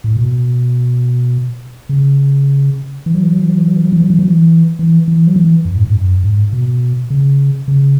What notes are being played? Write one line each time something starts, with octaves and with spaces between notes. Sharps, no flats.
A2
B2
C#3
E3
F#3
E3
F#3
E3
F#3
E3
F#3
E3
F#3
E3
F#3
E3
F#3
E3
E3
E3
F#3
E3
F#2
A2
G#2
F#2
G#2
B2
C#3
C#3